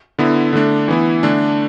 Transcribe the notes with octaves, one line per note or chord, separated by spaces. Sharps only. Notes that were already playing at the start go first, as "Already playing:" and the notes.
D3 B3 E4
D3 A3 D4
E3 B3 E4
D3 A3 D4